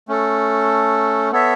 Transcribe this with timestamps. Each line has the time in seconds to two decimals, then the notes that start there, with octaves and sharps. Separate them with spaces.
0.08 A3 C#4 A4
1.32 B3 A4 C#5 E5